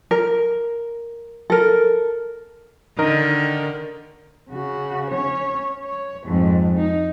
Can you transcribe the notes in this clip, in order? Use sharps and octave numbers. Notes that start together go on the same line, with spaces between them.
A#4
A4 A#4
D3 D#3 A#4 D#5
C#3 F#4
C#4 C#5
C#5
F2 G#2
D#4